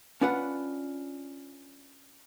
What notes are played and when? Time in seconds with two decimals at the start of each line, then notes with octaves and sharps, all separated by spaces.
0.21 C#4 D4 F4 B4 D5 F#5